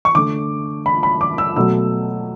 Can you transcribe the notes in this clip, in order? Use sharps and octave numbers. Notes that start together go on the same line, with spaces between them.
C#6
D3 A3 D6
B5
B5
D6
E6
B2 F#3 A3 E6